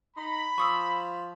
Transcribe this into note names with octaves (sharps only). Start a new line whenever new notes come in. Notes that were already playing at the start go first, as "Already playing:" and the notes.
D#4 B5
F3 C#6 D#6 E6